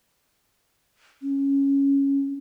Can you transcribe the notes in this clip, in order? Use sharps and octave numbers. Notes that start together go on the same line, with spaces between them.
C#4